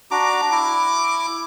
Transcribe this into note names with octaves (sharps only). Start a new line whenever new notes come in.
D4 F#4 A#5 D6
E4 D6